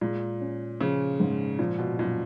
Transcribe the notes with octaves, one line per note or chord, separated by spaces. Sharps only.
A#2 G#3
C#4
C#3 F3
G#2
A#2 F3
B2
F#2 A#2